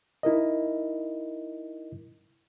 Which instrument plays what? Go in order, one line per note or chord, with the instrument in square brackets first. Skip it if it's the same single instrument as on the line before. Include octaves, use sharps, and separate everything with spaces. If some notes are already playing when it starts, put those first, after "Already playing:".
[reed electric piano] D#4 E4 A#4 D#5